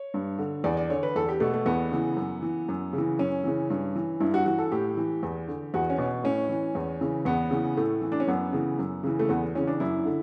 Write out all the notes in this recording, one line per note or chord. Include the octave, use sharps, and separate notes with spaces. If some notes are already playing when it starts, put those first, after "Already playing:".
Already playing: C#5
G2
D3
E2 D5
D5
D3 C#5
B4
E2 A4
G4
B2 A3
A3
E2 B3
C#3 E3
F#2
E3
F#2
C#3
E3
F#2 C#4
C#3 E3
G2
E3
G2 E4
F#4
E3 F#4
A4
A2 G4
E3
E2
D3
E2 F#4
C#4
B2
A2 C#4
E3
E2
C#3 E3
E2 B3
C#3 E3
A2 A3
E3
D4
C#4
F#2 B3
C#3 E3
F#2
C#3 E3
A3
E2 B3
C#3 E3 C#4
D4
F#2 E4
D3